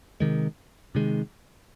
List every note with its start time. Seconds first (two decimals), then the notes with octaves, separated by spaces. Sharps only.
0.20 C3 D#3 G#3
0.95 C3 D#3 G#3